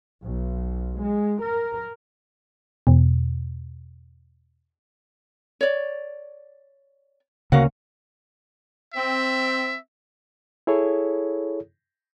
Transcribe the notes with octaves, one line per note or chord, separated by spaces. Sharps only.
B1
G#3
A#4
E2 B2
C#5 D5
D2 C#3 A#3 C#4 F#4 F5 F#5
C4 E5
E4 G#4 A4 C#5